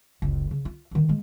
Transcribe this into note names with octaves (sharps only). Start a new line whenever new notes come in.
F#1 C#2
C#3
F4
D2 D#3
G#3 A#3